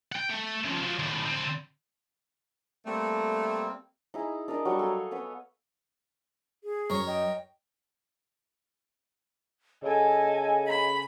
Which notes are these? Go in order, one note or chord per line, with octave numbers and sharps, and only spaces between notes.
F#5 G5
A3
C#3 F3
F3 F#3
D#2 A2
D3 C4
G3 A3 A#3 C4
D#4 E4 G#4
D4 A#4 D5 D#5
F#3 G3 C#6
A4 F5 G#5
B3 B4 C#5 D#6
G#4
F#2 A#4 C#5 C#6
D#5 G5
C#3 A4 D#5 G#5
B5